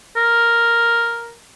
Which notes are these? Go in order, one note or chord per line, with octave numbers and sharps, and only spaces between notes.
A#4